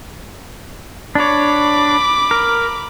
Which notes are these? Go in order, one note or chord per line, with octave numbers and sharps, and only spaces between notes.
D4 C#5 B5 D6
A#4